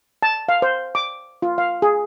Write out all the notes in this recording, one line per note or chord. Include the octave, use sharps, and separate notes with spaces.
A5
F5
C5
D6
F4
F5
G#4